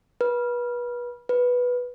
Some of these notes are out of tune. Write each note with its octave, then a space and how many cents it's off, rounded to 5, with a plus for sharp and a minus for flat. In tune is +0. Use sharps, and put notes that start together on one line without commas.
B4 -30
B4 -5